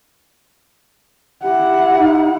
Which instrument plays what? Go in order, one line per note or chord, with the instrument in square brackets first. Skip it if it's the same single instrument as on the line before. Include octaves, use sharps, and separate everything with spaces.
[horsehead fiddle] E4 F#5 [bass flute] G4
[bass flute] D#4